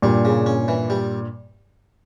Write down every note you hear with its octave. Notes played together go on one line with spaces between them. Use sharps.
G2 A#2 G3
C#3
C#4
E3
G3